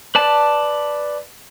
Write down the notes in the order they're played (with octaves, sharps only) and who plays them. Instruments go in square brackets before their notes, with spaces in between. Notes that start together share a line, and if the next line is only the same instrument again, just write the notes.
[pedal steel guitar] B4 D5 A5